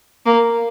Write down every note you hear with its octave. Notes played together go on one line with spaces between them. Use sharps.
A#3